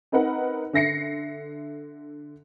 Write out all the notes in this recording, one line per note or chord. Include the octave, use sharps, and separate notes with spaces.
C4 D#4 A#4 B4 F#5
D3 E5 A#6 C7 C#7